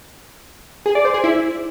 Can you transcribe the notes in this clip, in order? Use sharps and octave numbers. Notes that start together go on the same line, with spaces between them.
G#4
D5
C5
G#4
E4